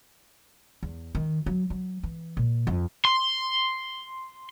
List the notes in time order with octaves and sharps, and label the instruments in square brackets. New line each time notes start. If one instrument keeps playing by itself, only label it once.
[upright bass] E2
D#3
F#3
F#3
E3
A#2
F2
[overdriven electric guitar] C6